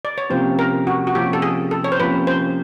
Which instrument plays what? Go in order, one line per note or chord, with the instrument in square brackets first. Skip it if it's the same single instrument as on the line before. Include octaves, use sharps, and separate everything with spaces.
[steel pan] D5
C#5
[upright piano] C3 F3 A#3 C#4 [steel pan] C5
[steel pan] A#4
F#4
F#4
[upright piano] C3 F3 A#3 C#4 [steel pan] G4
[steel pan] A4
G#4
A4
C#5
C5
[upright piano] C3 F3 A#3 C#4 [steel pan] B4
[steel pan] C5